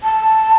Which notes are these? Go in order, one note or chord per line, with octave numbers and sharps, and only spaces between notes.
A5